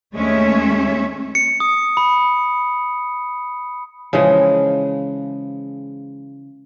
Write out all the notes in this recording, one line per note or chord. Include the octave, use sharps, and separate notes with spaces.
D#2 G#3 A3 C#4 C#5 E5
C#7
D#6
B5
C#3 E3 F3 G#3